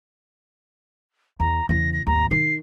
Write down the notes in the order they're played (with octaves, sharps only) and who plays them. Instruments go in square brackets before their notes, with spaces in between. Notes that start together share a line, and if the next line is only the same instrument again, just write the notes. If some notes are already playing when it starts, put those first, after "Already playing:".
[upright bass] E2 [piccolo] A#5
[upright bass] E2 C#3 [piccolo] A#6
[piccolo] A#6
[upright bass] G#1 D#2 [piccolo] A#5
[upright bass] D#3 D#4 [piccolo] C7